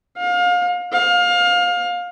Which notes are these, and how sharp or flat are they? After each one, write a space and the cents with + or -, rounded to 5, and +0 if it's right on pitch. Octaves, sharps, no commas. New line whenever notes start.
F5 +30
F5 +25